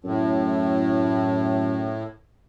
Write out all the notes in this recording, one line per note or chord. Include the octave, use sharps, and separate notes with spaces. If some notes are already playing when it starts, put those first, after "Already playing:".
F#2 A2